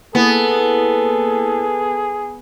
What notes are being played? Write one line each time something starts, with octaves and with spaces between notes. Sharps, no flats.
A#3 B3 E4 G#4 A4